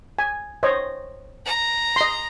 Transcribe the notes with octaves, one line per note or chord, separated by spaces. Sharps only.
G#5
C5 C#5 D#5
A#5
D#5 C6